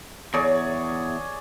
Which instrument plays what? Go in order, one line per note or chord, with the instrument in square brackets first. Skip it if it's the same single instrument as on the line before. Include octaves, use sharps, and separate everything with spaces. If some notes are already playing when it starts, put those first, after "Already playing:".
[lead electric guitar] E2 [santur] G#4 C#5 D5